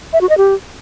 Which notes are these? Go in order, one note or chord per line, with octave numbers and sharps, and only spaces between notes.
E5
F#4
D#5
G4